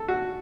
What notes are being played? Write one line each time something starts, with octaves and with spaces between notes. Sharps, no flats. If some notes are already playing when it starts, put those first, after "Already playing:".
Already playing: A4
F#4